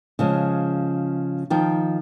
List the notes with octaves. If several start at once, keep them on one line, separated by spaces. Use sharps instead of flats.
C#3 F3 G#3
D#3 F3 G5